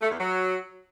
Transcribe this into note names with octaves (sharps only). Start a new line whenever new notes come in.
A3
E2
F#3